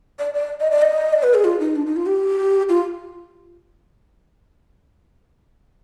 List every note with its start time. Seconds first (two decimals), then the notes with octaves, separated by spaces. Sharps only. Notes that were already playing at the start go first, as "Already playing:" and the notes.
0.19 D5
0.34 D5
0.60 D#5
0.71 D5
0.82 D#5
1.13 D5
1.23 B4
1.34 G#4
1.44 F4
1.60 D#4
1.76 D4
1.86 D#4
1.96 F4
2.06 G4
2.69 F4